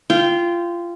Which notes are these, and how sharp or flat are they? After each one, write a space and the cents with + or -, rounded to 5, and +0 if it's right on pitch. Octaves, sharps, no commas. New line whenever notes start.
F4 -20 G5 +0